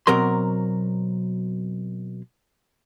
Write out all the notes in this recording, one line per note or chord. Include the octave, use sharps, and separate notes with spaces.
B2 F#3 C4 A#4 C6